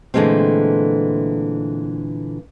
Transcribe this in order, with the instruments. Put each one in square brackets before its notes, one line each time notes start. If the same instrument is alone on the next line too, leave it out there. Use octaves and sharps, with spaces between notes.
[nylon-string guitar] A#2 D3 E3 G#3 A3 C4